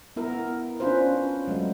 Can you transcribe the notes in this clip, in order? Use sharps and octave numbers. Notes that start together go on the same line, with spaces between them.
B3 E4 A#4
C#4 D4 F4 B4 C5
F#3 G#3 A3